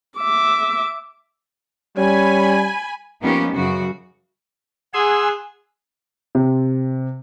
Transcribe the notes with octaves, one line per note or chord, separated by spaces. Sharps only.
E5 D6
G3 C#4 G#5 B5
F3 A#3 B3 C#4 D#4 G4
F#2 C#3 F#4
G#4 F#5 G#5 C6 E6
C3